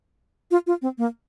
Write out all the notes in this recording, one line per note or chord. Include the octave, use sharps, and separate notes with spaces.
F4
F4
C4
A#3